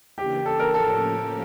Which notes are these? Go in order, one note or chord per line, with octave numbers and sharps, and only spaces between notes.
C#3 E3 A#3 D4 G4
A4
A#4
A2 F3 A#3 C#4 G4 A4